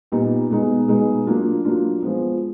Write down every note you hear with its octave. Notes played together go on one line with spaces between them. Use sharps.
A#2 G3 B3 D#4
B2 G#3 B3 D#4
B2 G#3 B3 D#4
F#3 A#3 D4 F4
F#3 A#3 D4 F4
F3 G#3 B3